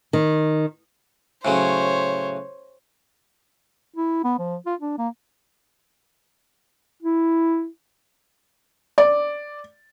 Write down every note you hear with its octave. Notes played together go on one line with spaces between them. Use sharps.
D#3
A2 C#3 F#3 C5 C#5
E4
B3
F3
F4
D4
A#3
E4
D5